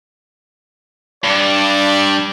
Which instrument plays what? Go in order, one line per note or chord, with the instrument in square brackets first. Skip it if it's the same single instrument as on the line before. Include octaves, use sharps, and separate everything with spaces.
[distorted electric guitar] G2 [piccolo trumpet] D5